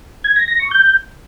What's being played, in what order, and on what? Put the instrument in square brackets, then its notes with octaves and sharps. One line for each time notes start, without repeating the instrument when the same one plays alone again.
[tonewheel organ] G#6
A#6
A#6
C#6
G6